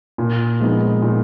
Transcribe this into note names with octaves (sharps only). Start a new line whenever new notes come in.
A#2
F3 G#3 B3 D#4
A#2